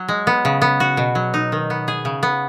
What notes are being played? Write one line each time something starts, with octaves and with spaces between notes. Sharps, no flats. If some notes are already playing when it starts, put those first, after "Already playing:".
Already playing: F#3
G#3
B3
C#3
B3
F#4
B2
F#3
D#4
D#3
B3
G#4
C#3
B3